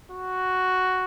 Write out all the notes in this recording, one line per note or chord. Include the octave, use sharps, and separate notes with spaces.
F#4